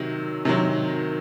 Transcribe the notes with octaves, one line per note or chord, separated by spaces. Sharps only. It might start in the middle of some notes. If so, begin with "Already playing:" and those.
Already playing: C3 D#3 F#3
C3 D#3 F#3